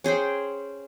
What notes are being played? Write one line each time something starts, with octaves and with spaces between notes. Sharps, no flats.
C#4 G#4 C5 G5